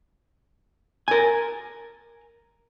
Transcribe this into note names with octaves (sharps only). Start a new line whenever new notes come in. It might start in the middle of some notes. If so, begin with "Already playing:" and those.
A#4 G#5